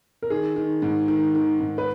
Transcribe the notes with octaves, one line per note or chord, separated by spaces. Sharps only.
A#4
D#3 G#4
D#3
G#2
D#3
D#3
G#2
B4